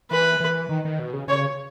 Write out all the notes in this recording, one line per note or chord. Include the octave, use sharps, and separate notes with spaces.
E3 B4
E3
D#3
D#3
B2
C#3
C#3 C#5